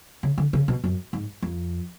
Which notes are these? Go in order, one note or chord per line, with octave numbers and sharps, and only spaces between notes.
C#3
D3
C#3
B2
F#2
G#2
F2